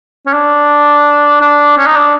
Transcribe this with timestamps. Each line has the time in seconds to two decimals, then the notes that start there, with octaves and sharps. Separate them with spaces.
0.26 C#4
0.33 D4
1.41 D4
1.77 C#4
1.86 D#4
1.95 D4